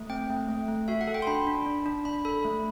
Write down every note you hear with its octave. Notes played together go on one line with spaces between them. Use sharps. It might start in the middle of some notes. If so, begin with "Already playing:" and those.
Already playing: A3
C4 G5
A3
A3
A3
F#4 E5
F#5
A4
G5
C6
D4 B5
D4
D4
D4
D4 B5
A4 B5
A3